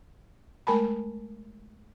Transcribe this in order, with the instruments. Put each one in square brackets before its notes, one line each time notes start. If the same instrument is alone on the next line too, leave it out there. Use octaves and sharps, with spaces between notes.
[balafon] G#3 A3 A#4 G#5 A5 B5